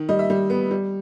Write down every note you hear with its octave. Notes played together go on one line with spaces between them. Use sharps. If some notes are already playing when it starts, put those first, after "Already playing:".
Already playing: D#3
G3 D#5
E5
G3
B3
G3